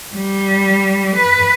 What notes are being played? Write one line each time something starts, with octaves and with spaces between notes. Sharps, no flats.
G3
B4